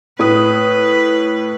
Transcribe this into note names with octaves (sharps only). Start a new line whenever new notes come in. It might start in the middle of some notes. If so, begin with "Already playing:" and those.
A2 B4 D#6